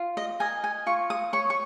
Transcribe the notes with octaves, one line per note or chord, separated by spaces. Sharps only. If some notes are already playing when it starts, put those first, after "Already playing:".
Already playing: F4
D#5
A#4 D#5 G#5
G#5
F4 C#6
D#6
C#5 C#6
C#6